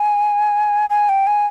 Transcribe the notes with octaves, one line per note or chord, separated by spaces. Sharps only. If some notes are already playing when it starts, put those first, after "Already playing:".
Already playing: G#5
G#5
G5
G#5